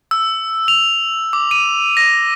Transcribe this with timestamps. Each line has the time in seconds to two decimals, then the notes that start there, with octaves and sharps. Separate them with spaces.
0.11 E6
0.68 F7
1.33 D6
1.51 D#7
1.97 A#6